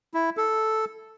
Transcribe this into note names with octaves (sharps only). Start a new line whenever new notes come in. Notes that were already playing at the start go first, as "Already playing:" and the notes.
E4
A4